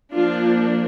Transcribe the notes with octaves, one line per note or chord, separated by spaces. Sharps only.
F3 A#3 D4 F4